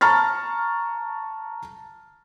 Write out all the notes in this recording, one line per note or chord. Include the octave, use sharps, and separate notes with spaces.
A5 A#5 C#6 F6 A6